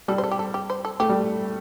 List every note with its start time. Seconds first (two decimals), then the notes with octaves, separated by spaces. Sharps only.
0.08 G3 A4
0.18 C5
0.24 A4
0.31 G4
0.39 A4
0.54 G4
0.70 C5
0.85 A4
1.00 A3 G4
1.09 G3